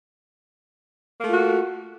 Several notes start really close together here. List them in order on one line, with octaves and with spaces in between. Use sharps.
A#3 A3 F4 F#4